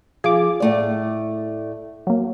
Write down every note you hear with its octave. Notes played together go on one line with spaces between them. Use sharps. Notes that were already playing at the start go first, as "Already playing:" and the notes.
F3 G#4 D6
A2 A3 D5
F#3 A#3